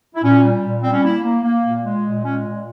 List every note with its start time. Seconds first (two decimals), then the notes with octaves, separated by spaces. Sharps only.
0.15 E4
0.23 A#2 C#4
0.43 G3
0.63 A#2
0.83 G3 C4
0.93 C#4
1.03 A#3 E4
1.23 A#3
1.44 A#3
1.64 A#2
1.84 G#3
2.04 A#2
2.23 G#3 C#4
2.45 A#2